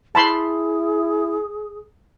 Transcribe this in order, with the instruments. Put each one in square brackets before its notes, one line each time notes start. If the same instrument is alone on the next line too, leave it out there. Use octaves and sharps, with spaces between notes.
[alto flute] E4 [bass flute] G#4 [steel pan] A5 B5 C6